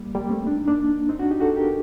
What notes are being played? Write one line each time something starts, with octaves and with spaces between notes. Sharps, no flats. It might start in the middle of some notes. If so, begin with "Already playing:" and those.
Already playing: G3 A#3
G3 A#3
A3 C4
D4
D#4
A#3 D4
C4 D#4
D4 F#4
D#4 G4
F#4 A4
G4 A#4